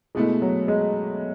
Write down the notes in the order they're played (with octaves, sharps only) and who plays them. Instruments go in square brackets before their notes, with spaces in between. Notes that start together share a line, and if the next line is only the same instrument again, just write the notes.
[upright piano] B2 A3 E4 [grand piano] G#3
[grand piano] F#3
G#3